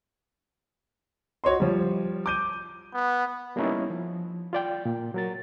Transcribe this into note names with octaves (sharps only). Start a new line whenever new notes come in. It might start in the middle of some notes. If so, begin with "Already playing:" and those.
F#4 C#5 D#5 C6
F3 G3
D6 G6 D#7
B3
G3 A#3 B3 C#4 D#4 E4
F3
F4 D5 G5
A#2
F#3 A#4 A6